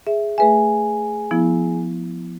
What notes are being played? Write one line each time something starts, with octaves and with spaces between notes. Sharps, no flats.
G#4 E5
A3 G#4 B4 E5 G#5
F3 B3 E4